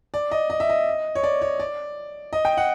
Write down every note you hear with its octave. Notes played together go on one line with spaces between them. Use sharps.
D5
D#5
D#5
E5
D#5
C#5
D5
C#5
D5
D#5
G5
F#5